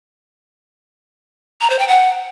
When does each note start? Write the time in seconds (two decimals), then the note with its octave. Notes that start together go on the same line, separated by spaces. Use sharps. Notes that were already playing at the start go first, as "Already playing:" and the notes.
1.61 A#5
1.70 C5
1.79 G5
1.88 F#5